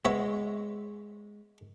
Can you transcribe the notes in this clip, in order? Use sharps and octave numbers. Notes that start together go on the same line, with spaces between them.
G#3 B3 C#5 E5